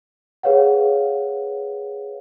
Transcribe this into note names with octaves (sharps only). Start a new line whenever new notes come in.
G#4 B4 C#5 F5 F#5